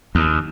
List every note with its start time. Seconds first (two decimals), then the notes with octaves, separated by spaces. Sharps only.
0.15 D#2